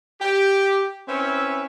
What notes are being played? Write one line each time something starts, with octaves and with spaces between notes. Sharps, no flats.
G4
C4 C#4 E4 B4 E5